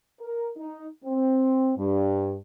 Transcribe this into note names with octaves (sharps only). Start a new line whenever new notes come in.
A#4
D#4
C4
G2